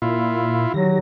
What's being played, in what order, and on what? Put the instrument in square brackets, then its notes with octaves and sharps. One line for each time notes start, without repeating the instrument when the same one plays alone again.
[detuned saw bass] A#2 [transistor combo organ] E4 F4
[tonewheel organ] D#3 G4 A#6 [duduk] F#3